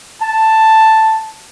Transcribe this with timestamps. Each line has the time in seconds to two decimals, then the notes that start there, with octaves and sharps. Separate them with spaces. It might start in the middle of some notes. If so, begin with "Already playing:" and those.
0.22 A5